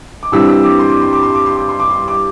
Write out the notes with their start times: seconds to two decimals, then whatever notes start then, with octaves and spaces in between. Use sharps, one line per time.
0.23 D6
0.32 G2 E3 G3 C4 E6
0.48 E6
0.63 D6
0.79 C6
0.90 D6
1.01 C6
1.13 D6
1.23 C6
1.35 D6
1.46 C6
1.57 D6
1.69 C6
1.80 D6
1.90 C6
2.08 D6